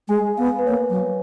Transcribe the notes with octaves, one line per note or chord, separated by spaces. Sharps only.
G#3 G#5
B3 F5
B4
A#3 C#5
F#3